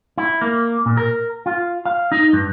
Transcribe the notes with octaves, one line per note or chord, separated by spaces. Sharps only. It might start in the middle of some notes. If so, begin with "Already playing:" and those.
E4
A#3
A#2
A#4
F4
F5
D#4
G2